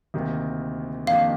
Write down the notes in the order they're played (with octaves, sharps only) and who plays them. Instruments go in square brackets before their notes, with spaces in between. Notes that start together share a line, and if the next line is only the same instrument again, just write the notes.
[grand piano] D2 C3 D#3 A#3
[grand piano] F2 D#3 A#3 D4 G4 [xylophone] F5